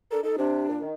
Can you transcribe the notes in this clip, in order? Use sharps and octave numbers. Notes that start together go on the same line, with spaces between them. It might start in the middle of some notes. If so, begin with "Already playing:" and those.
D4 A4 A#4
D#4 A4
C3 D4
A#2
D#3